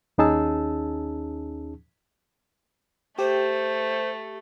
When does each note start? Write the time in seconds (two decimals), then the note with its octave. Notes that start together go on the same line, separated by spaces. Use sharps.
0.18 D#2 C#4 D#4 G#4 A5 E6
3.19 A3 G4 C5